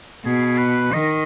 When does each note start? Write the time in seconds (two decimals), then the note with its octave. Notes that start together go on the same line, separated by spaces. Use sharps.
0.25 B2 G#4
0.58 B4
0.93 D#3 D#5